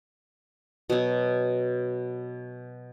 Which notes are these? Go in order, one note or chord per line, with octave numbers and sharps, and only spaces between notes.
B2 F#3